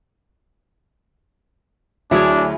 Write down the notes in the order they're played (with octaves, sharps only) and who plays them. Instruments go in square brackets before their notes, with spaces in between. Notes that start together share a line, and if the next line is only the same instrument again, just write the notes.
[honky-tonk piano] D2 F#3 [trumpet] D4 [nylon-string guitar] E4 G#4 C#5